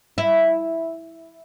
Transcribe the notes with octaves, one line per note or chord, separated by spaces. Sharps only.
E4